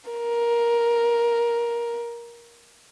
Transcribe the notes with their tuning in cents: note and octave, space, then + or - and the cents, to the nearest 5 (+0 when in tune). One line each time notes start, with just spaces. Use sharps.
A#4 +15